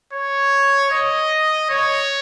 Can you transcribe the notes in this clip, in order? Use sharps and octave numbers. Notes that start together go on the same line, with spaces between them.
C#5
D#5
C#5